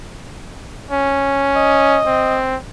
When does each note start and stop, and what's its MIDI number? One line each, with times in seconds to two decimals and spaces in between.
0.90 2.00 61
1.56 2.38 75
2.06 2.56 60